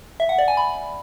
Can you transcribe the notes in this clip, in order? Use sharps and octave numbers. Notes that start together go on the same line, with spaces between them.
E5
F#5
D5
G#5
B5